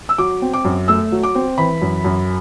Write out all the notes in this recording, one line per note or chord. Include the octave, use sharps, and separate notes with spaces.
E6
F#3 D6
C4
D6
F#2
A3 E6
F#3
D6
C4
E3 B5
F#2
F#2